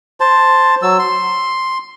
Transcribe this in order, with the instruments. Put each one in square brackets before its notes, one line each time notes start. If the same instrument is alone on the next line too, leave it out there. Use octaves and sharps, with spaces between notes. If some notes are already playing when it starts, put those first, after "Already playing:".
[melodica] C5 A5
F#3 E6
C6